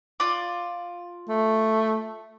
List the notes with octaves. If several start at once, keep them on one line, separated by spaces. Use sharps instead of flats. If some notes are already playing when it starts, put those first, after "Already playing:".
F4 D5
A3